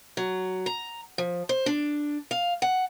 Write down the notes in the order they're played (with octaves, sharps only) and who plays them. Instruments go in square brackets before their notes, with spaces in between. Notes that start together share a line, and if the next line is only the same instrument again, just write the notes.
[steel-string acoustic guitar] F#3
A#5
F3
C5
D4
F5
F#5